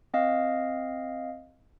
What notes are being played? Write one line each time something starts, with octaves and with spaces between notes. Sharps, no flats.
C4 D#5 F5